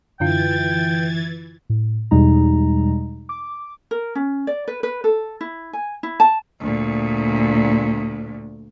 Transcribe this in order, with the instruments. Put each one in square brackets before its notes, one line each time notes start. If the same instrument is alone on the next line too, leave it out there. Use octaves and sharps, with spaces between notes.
[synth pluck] F#2 D3 F4 [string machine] E3 G#6 A6 [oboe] G5
[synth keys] A2
E2 B2 G3 G#3 D#4 A#5
D6
[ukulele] A#4
C#4
D5
B4
B4
A4
E4
G#5
E4
A5
[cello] D2 A#2